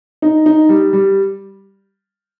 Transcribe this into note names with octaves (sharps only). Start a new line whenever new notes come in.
D#4
D#4
G3
G3